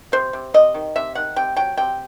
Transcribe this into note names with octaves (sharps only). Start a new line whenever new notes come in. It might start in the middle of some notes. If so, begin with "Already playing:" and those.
C3 C5
C3
C3 D#5
D#3
C3 E5
D#3 F#5
C3 G5
F#3 G5
C3 G5